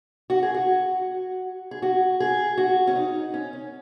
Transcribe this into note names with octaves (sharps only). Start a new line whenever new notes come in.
F#4
G#4
F#4
G#4
F#4
G#4
F#4
C#4
D#4
C#4
C#4